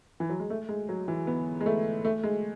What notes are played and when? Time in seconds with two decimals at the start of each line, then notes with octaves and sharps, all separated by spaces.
0.20 E3
0.30 F#3
0.40 G#3
0.50 A3
0.69 G#3
0.89 F#3
1.08 E3
1.27 B3
1.61 G#3
1.66 A3
2.05 A3
2.24 G#3